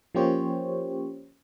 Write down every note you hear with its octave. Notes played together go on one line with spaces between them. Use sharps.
F3 A#3 C#4 G4 C5 C#5